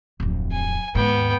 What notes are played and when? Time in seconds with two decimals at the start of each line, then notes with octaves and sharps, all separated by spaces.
0.20 D1 F2
0.52 G#5
0.95 D#2 G#2 B3 G5